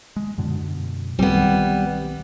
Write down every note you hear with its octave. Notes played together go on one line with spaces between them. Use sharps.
G#3
F#2 B2 D3
B1 D#3 G3 B3 C4